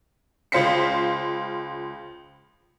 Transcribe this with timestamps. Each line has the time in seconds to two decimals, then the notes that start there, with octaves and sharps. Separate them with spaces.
0.52 C#2 F4 C5 F5 B6 C#7